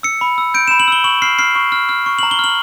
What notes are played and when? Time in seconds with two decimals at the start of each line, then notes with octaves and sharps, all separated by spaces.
0.03 E6 C#7
0.21 B5
0.38 E6
0.54 G6 D7
0.68 B5 E7
0.80 F#7
0.88 E6 G7
1.04 C#6 F#7
1.22 F6 C7
1.39 F6 C7
1.55 C#6
1.72 F6
1.89 F6
2.06 C#6
2.19 F#7
2.23 A#5
2.31 G7
2.39 F6 F#7